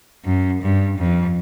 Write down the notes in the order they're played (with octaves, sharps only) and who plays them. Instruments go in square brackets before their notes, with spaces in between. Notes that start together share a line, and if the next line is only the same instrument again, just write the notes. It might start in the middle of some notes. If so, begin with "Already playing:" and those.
[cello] F#2
G2
F2